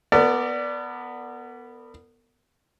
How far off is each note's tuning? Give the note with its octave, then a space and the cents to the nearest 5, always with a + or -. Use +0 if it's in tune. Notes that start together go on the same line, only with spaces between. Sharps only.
B3 +0 A#4 -45 D5 +0